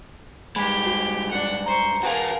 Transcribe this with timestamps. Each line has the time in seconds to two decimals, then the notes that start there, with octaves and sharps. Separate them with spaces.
0.56 G2 G#3 G4 B5
0.86 F#4
1.31 D4 F#5
1.66 C5 A#5 C#6
2.03 F#4 G#4 A#4 B4 F5 F#5 A5